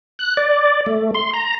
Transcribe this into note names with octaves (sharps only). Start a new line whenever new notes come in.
F#6
D5
A3
C6
A#5